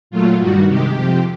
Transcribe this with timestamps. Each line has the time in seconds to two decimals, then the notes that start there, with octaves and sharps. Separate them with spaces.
0.10 A#2 F#3 A3 F4
0.39 G2 D#3 G3 F#4
0.67 C3 D#3 G#3 G4
0.95 F2 C3 F3